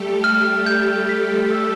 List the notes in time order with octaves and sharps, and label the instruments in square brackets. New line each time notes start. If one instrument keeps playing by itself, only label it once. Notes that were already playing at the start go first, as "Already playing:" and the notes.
Already playing: [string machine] G3 A3 G4 A4
[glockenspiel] F6
G6
B6
E6